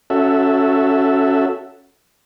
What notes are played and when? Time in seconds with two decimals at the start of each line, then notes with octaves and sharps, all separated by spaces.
0.10 C#4 F#4 A4 E5